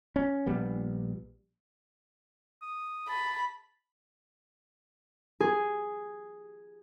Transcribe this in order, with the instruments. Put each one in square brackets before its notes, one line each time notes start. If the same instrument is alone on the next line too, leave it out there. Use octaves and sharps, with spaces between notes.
[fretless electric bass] C#4
A#1 G3 B3
[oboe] D#6
[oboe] A5 [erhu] B5
[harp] G#4